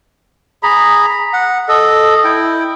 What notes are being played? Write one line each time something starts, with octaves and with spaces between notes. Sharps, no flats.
G#4 A#5 B5
F#5
A4 D#5
E4 G5